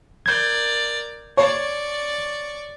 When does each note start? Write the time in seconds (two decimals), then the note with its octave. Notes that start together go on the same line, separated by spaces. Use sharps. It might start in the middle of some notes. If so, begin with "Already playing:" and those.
0.26 A#4 D5 G6 G#6
1.37 C#5 D5 C#6